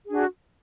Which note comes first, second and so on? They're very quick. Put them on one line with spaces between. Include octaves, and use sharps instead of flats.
G#4 D4 F#4